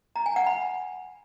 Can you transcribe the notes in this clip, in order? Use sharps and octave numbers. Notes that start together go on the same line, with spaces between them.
A#5
G#5
F#5
B5